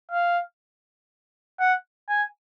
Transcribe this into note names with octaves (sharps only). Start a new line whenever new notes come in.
F5
F#5
G#5